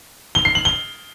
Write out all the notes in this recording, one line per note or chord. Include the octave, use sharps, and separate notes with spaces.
G7
C7
F#7
G7